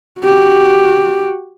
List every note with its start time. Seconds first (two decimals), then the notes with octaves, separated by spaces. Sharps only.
0.21 F#4 G4